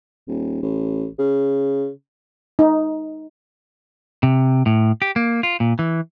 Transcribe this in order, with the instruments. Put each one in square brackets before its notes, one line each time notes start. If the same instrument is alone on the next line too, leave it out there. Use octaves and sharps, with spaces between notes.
[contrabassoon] D#1
A1
C#3
[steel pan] D#4
[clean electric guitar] C3
A2
G4
A#3
F4
A#2
E3